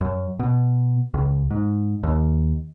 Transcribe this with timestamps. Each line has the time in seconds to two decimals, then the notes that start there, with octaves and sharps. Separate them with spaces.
0.01 F#2
0.39 B2
1.14 C#2
1.51 G#2
2.03 D#2